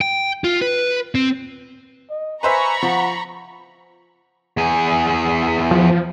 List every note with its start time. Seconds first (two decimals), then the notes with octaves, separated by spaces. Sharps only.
0.01 G5
0.44 F4
0.62 B4
1.15 C4
2.10 D#5
2.43 B4 C5 E5 G#5 A#5 B5 C#6
2.83 F3 F#5
4.57 E2 G#4
5.71 F3